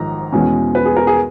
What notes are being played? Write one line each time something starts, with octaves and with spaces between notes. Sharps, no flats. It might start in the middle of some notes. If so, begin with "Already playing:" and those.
Already playing: A#1 G#2 D#3 A#5
E2 B2 G#3 C#4
B4
G#4
A#4
G#4